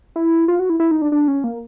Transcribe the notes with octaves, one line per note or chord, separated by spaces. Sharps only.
E4
F4
F#4
E4
E4
D#4
D4
D4
C#4
A#3